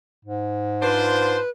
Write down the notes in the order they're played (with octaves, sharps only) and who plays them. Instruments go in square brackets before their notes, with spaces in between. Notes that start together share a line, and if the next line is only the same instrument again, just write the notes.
[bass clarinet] G#2
[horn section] D4 F4 C5 [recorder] B4